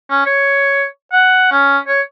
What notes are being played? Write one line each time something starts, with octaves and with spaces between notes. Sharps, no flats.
C#4
C#5
F#5
C#4
C#5